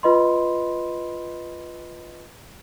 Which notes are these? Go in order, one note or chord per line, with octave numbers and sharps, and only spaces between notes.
F4 B4 D#5 B5 C6